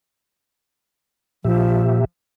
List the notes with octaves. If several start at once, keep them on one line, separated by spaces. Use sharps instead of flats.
A#2 F3 G4 E5